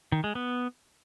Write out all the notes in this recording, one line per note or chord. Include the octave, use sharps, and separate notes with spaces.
D#3
G#3
B3